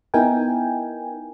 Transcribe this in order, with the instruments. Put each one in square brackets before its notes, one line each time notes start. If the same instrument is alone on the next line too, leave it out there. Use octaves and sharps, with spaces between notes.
[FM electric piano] B3 D#4 E4 A#4 G5 G#5